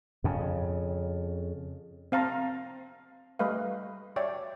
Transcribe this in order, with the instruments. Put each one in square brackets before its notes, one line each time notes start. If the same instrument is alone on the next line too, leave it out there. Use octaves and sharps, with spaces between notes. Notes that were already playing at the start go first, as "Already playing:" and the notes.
[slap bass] F2 C#3
[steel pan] C4 F5 A5 A#5
G3 A3 B4 D#5 F5
C#5 D5 E5 G5